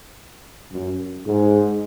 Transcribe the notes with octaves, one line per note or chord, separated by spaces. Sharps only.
F#2
G#2